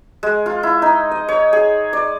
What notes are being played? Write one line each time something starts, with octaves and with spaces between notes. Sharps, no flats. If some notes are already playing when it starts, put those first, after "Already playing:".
G#3
F4
E4
D#4
D#5
C#5
G#4
D5